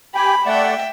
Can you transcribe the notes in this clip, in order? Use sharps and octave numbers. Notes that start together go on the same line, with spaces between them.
G4 G5 G#5 B5
A3 D5 E5 F#5 G5